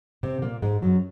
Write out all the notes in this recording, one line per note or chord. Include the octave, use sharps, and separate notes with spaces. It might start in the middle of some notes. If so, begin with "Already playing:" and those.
C3 C4
A#2 A#3
G#2 G#3
F#2 F#3